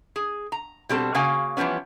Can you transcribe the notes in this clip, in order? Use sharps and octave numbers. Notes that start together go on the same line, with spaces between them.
G#4
A#5
B2 G3 C4 A4
C#3 A#3 F#4 F5 G#5
E3 F3 G3 B3 C#4